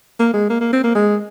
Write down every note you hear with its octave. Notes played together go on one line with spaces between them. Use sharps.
A#3
G#3
A#3
A#3
C4
A#3
G#3